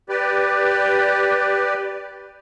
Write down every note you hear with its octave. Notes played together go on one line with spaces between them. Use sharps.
G4 B4 D5